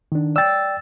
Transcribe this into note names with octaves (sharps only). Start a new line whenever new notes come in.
D#3 D4
D5 G5 E6 A6